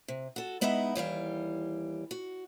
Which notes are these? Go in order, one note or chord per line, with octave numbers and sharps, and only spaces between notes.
C3
F#4 A4
G#3 B3 D#4 E4 D#5 E5
D#2 E3 G3 F5
F#4